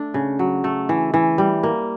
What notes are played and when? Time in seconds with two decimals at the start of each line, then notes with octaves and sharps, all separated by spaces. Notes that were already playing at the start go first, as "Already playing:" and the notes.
Already playing: A3 D4
0.14 C#3
0.39 F#3
0.64 A3
0.89 E3
1.14 E3
1.38 G3
1.63 A#3